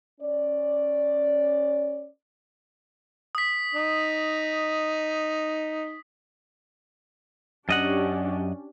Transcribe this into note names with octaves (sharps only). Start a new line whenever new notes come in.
C#4 D5
D#6 B6
D#4
F#2 C#4 D4 G4 D#5 F#5